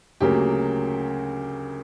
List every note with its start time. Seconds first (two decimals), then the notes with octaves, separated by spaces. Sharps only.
0.21 D2 C#3 F#3 A#3 G4